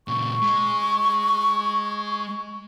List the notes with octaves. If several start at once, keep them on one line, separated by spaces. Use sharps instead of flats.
A#2 C#3 C#6
G#3